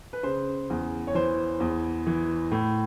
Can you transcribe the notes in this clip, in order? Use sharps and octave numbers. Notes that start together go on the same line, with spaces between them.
B4
C#3 C5
E2
C#5
E3 C5
E2
E3
A2